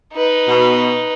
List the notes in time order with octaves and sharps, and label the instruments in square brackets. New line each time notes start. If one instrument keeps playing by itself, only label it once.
[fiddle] D#4 B4
[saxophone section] B2